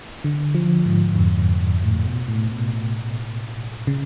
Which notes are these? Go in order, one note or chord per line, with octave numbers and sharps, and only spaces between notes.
D3
F3
G#2
F2
F2
A2
B2
A2
B2
A2
C#3